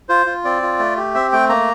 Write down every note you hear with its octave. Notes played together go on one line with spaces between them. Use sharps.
F4 C5
F4
C4 D5
F4
A3
G4
C4 E5
A3 G5
A#3 A#5